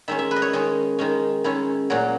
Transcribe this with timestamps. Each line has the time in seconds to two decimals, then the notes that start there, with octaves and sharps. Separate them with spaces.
0.08 D#3 G#3 C#4 E5
0.19 E5
0.31 B4
0.36 D#5
0.42 C#5
0.53 D#3 G#3 C#4 D#5
0.99 D#3 G#3 C#4
1.44 D#3 G#3 C#4 E4
1.90 A#2 F#3 C#4